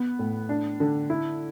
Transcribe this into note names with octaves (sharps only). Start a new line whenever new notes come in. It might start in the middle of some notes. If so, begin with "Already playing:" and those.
Already playing: B3
A2
D4
D3
E4